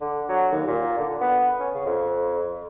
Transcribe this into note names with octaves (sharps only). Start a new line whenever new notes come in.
D3
F#3
D#2
A#2
D3
B3
C#4
C#3
F2